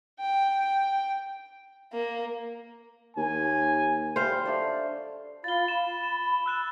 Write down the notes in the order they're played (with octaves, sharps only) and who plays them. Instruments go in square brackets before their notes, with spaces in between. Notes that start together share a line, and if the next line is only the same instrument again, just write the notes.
[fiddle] G5
[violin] A#3
[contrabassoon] D#2 [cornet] G#5
[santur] G3 [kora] C5 F5
[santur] A3 D4 D5
[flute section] F4 F5 B5 [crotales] A6 G7
[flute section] B5 [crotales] E7
[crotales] E7
E6 F#6 E7